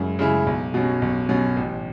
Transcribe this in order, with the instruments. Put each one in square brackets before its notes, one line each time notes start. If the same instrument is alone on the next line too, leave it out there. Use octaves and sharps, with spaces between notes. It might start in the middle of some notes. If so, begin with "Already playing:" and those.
Already playing: [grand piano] F#2 C#3 G#3 C#4 E4
C#3 G#3 C#4 E4
B1
B2 F#3 C#4
B1
B2 F#3 C#4
A1